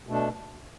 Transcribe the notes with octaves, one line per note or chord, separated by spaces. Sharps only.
B2 A3 D4